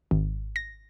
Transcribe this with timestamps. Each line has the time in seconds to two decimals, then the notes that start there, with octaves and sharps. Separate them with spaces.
0.11 G#1
0.56 A#6